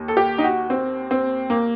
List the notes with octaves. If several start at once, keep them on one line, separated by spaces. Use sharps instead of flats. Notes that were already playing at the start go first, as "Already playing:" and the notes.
Already playing: D#2
A4
G4
D#4
F#4
C4
C4
A#3